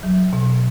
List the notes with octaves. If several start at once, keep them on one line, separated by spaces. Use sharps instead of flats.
F#3
B2